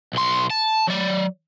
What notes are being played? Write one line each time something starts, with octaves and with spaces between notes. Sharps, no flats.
B1 C6
A5
F#3 D5